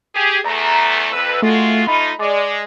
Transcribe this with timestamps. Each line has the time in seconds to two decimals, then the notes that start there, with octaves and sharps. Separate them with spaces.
0.15 G4 G#4
0.45 E2 A3 A#5
1.12 F2 B4 E6
1.42 G#3 A3 F4 F#4
1.87 A3 D#4 F4 B5
2.20 G#3 D5